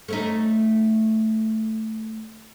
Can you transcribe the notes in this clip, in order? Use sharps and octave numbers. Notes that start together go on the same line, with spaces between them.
A3 C#4 D#4